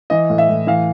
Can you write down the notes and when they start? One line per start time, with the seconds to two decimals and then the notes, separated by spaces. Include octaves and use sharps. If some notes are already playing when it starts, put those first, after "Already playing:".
0.10 E3 D#5
0.30 A2
0.38 E5
0.49 A2
0.67 E3 F5